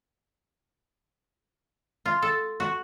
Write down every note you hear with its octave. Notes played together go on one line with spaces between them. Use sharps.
F4
A4
F#4